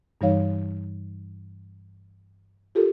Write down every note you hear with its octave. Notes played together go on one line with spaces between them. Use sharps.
G2 E3 G3 D#4 C#5 F5
F4 G4 A4 A#4